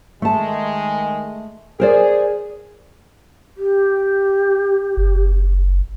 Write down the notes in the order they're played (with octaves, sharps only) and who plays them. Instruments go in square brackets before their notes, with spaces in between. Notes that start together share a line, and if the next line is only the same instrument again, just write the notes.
[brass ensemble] D#3 G#3 [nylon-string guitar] A3 A5
[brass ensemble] G#4 [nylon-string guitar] A#4 C5 D5
[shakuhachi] G4
[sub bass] F#1